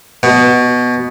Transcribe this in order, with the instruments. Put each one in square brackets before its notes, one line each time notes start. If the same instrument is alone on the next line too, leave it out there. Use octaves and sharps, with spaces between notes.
[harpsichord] B2